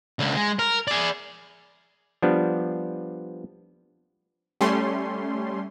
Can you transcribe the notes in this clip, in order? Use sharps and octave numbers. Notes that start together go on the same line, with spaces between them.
C#2 D3
G#3
A#4
G#4 D5
F3 G3 B3 D4
G3 A3 C#4 C6